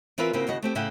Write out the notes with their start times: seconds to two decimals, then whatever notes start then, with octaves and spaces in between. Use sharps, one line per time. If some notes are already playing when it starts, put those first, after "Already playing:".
0.18 E3 C4 F4 A#4 B4 E5
0.33 C#3 A#3 C4 E4 F#4
0.47 D#2 C#3 F#4 D#5
0.62 A3 C4 G4
0.75 A2 C#3 E4 E5 F#5 G5